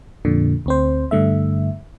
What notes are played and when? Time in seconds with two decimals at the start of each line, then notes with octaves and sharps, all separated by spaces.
0.25 F2 A#2 D3
0.66 D2 C4 C5
1.11 G2 D3 A3 E5